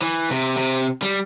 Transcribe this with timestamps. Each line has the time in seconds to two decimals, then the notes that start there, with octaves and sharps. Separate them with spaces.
0.01 E3
0.31 C3
0.57 C3
1.02 G3